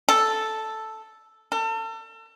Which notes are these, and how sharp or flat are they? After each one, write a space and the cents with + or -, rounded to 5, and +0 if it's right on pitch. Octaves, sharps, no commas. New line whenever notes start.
A4 +0
A4 +35